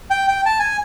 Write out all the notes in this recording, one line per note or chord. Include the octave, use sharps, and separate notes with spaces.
G5
G5
A5
G#5